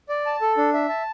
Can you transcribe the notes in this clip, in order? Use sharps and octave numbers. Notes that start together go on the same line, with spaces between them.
D5
A5
A4
D4
E5
A5